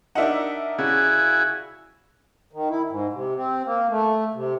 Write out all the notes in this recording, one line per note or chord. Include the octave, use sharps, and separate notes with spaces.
D4 D#4 A#4 E5 F#5
C#3 E4 F#4 G#5
D#3
E4
G#2
C3
C4
A#3
A3
C3